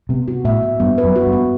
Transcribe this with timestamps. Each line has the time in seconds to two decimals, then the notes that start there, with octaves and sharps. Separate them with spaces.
0.09 C3 B3
0.28 F#4
0.44 A2 E5
0.62 B3
0.80 G2 B3
0.98 B4
1.04 F#2
1.16 F#4
1.26 G2
1.33 B3